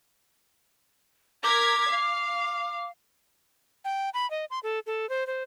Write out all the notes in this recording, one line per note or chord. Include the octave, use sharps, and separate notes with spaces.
A#4 D6 G#6 B6
F5
G5
B5
D#5
C6
A4
A4
C5
C5